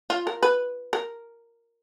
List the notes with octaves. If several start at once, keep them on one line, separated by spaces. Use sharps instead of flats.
F4
A#4
B4
A#4